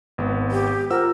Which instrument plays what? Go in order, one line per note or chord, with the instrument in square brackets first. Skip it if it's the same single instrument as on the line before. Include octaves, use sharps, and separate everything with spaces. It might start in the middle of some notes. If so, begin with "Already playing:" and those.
[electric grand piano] G#1 B3
[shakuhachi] G4
[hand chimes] F4 C5 F#5 [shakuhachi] A#4 [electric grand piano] E6